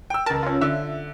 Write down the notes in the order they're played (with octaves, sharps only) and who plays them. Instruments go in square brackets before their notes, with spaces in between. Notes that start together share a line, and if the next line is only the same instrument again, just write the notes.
[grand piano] G5 E6
[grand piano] C#2 A#4 [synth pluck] A5
[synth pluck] C#4 F4
[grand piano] D3 [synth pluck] E5